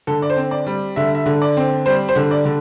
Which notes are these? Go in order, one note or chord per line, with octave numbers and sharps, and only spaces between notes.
D3 A4
D5
C5
C4
D5
G3
D3 E5
E5
D3
D5
C4
G3 C5
C5
D3
D5
D3